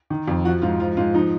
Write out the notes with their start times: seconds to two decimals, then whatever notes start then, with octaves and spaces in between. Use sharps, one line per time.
0.10 D#3
0.28 F2
0.45 F3 F#4
0.62 G#2 F4
0.80 F3 F4
0.97 G#2 F4
1.14 F3 D#4